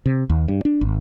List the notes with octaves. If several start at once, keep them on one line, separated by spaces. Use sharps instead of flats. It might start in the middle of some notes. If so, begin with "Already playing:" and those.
C3
D#2
G2
D4
G#1